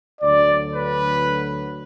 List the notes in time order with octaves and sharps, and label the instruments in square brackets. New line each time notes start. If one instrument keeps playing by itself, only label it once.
[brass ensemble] D2 D3 F#3 D5
B4